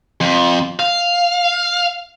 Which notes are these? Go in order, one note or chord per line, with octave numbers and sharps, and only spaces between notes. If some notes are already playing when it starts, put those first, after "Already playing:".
F2
F5